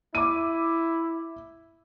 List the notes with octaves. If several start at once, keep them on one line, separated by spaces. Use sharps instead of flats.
E4 D6 D#7